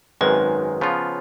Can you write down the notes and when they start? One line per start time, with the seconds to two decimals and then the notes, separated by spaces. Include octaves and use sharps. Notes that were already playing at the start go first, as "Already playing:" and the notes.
0.21 G#1 F#2 D#3 G#3 B4
0.81 C#3 F3 B3 F4